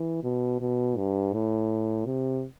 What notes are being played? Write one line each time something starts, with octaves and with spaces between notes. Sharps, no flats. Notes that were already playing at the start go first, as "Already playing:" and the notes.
Already playing: E3
B2
B2
G2
A2
C3